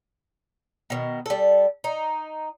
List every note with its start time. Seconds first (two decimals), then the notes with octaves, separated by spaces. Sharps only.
0.90 B2 D#3
1.26 G3 A4
1.84 D#4